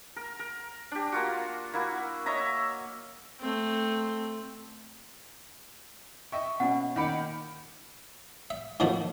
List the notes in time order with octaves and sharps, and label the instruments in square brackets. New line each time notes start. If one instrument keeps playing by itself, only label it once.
[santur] A#4
A#4
D4 G4
A#3 F4 F#4
A#3 E4 F#4
C#5 D#5 E5 A#5
[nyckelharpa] A3 C4
[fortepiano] D#5 E5 G5 [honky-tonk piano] C#6
[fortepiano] B2 [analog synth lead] C#4 [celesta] F#5
[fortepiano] A#2 [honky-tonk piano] D#3 B5 C#7 [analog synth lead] D6
[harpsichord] E5
A2 D#3 F3 A#3 F#4